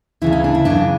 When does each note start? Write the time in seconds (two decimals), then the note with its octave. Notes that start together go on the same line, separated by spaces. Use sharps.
0.22 D2 C#3 E3 E4
0.32 C#4
0.44 D4
0.55 E4
0.65 F#2 C#3 E3 D4